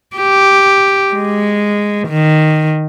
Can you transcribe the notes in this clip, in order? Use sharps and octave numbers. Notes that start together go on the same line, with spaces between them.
G4
G#3
D#3